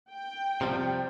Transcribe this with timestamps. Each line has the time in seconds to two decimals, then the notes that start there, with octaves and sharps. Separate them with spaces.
0.11 G5
0.61 C3 F3 G3